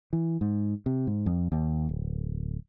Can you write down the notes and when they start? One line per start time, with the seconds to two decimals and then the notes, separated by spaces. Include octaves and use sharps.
0.13 E3
0.41 G#2
0.86 C3
1.07 G#2
1.26 F2
1.52 D#2
1.89 D1